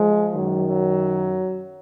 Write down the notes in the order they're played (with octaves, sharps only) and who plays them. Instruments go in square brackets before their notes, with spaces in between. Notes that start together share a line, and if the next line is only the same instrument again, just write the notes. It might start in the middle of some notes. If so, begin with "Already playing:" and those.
Already playing: [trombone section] F3 G#3
F#2 D#3 F#3
F#3